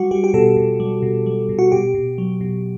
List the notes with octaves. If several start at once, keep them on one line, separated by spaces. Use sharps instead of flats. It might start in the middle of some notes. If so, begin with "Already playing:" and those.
Already playing: G3 F#4
G3 G4
G4
B2 A4
B2
G3
B2
G3
B2
F#4
B2 G4
B2
F#3
B2